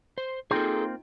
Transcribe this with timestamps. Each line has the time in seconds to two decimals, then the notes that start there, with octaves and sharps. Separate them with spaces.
0.18 C5
0.51 A#3 C4 D#4 F4 G#4 A4 C5 G5